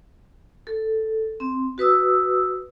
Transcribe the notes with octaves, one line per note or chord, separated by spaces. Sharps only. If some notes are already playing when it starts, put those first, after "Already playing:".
A4
C4
F#4 B4 D#6 E6